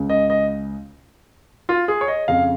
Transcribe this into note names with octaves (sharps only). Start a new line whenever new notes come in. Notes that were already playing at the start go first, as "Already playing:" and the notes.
Already playing: C#2 C#3
D#5
D#5
F4
G#4
C#5
D#5
F2 C#3 F5